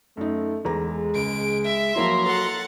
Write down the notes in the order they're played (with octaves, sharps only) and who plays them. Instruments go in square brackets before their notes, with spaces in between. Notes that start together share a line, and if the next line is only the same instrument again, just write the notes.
[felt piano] F#2 D#4 [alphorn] A3
[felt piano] E2 A4 A#5 [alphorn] G#3
[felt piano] C#2 [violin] D7
[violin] E5
[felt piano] F3 A#3 E4 [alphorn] F#3 [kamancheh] A#5 C6
[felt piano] A4 [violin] F#5 A6